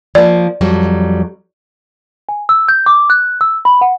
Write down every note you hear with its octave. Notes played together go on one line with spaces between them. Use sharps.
F3 A#3 D5
F2 F#3 G3
G#5
E6
G6
D6
F#6
E6
B5
F#5